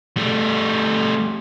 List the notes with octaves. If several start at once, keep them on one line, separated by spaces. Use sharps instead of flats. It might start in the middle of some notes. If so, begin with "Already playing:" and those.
G3 A3